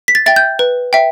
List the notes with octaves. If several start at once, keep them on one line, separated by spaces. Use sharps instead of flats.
B6
A6
E5 G5 A6
G6
B4
E5 G5